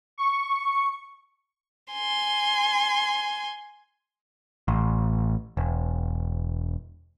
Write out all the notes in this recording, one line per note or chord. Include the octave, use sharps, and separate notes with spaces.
C#6
G#5 C6
A1
E1